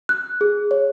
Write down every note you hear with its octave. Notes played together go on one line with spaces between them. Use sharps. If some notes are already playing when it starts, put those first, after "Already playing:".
F#6
G#4
C#5